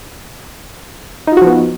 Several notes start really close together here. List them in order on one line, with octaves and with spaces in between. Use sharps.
D#4 F4 F#4 F3 B3